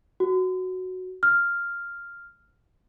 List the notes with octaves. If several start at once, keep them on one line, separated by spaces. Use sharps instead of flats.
F#4
F6